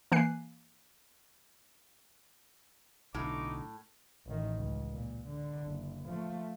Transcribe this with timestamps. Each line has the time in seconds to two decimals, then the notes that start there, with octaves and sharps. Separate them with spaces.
0.12 E3 A#3 G#5 F#6 C7
3.14 B1 A2 D3 D#4 D6
4.26 A1 D#3
4.57 C#2
4.91 A#2
5.28 D3
5.63 F#1
6.06 F3 A3